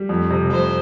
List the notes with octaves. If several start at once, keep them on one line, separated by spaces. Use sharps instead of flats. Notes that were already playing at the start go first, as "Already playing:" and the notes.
Already playing: G3
F2
C3
F2 C5